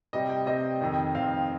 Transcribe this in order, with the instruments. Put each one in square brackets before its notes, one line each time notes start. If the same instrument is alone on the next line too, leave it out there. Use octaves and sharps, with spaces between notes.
[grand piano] C3 G3 C4 D#5
G5
C3 G3 C4 D#5
F2 D#3 C4
F2 D#3 C4 F5